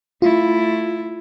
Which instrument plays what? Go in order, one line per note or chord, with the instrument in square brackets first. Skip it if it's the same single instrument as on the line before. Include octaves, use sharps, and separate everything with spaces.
[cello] A3 E4 [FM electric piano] F4